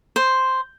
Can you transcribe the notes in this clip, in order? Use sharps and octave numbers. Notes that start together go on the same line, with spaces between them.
C5